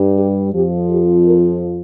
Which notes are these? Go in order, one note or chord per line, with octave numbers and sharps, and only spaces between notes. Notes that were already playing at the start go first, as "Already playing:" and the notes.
Already playing: G2 G3
G4
F2 F3 G4
G4
A#4